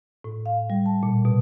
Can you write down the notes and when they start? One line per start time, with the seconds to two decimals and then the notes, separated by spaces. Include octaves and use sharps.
0.24 A2
0.46 F5
0.70 G3
0.86 A5
1.03 A#2
1.25 B2